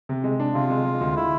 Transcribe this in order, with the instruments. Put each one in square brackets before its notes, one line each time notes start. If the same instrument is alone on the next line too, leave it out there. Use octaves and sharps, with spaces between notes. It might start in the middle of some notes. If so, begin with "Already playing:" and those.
[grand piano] C3
G#3
D4
[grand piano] C3 [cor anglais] F4
[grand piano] G#3
G#3
D2
[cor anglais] E4